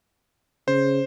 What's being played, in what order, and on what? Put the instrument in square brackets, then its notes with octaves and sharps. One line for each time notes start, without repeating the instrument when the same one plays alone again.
[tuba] C#3 [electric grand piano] C5